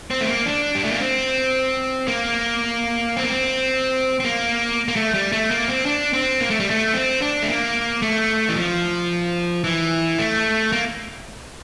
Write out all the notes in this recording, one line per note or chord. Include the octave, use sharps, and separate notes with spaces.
C4
A3
A#3
D4
G3
A3
A#3
C4
A#3
C4
A#3
C4
C4
A#3
A#3
A3
G3
A3
A#3
C4
D4
C4
A#3
A3
G3
A3
C4
D4
A3
A#3
A3
E3
F3
E3
A3
A#3